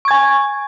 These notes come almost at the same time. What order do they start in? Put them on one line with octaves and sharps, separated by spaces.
C#6 G#6 G#5